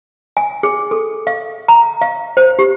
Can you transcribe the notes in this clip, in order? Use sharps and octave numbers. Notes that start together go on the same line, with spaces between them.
G#5
G#4
A4
F5
A#5
F5
C5
G4